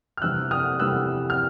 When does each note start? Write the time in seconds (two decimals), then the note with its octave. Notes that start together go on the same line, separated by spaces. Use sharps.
0.17 F6
0.22 E2 C3 E3 G3 E6 F#6
0.51 D#6 F6
0.79 E2 C3 E3 G3 E6 F#6
1.30 F6